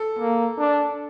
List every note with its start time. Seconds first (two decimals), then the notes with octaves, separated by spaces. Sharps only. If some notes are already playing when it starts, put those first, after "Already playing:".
Already playing: A4
0.18 A#3
0.58 D4